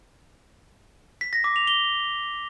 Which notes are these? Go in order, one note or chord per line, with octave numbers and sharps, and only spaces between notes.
B6
A#6
D6
F7
G7